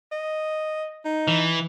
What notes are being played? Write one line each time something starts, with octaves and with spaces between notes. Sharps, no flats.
D#5
D#4
E3